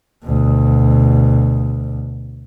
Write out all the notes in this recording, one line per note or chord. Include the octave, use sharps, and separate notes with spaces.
D2 B2